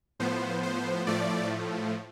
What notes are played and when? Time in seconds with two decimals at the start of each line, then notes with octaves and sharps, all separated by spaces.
0.20 A2 F3 B3 C5
0.63 C5
1.07 A2 F3 A3 D5